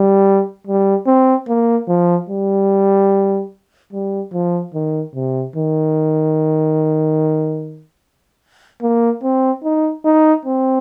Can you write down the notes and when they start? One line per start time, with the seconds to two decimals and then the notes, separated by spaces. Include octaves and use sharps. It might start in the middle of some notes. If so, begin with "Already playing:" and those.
Already playing: G3
0.67 G3
1.07 C4
1.48 A#3
1.88 F3
2.29 G3
3.93 G3
4.33 F3
4.74 D#3
5.15 C3
5.56 D#3
8.82 A#3
9.23 C4
9.64 D#4
10.05 D#4
10.45 C4